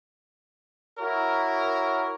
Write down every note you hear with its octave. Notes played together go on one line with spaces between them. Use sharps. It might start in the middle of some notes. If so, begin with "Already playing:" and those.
E4 F#4 A#4 C#5